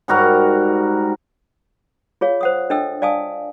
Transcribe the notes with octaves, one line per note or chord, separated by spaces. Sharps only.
G#2 G3 F#4 A#4
F4 G#4 C#5 F5
C5 F#5 D#6
D4 A4 D#5 G5 E6
D5 F5 G#5 A5 D#6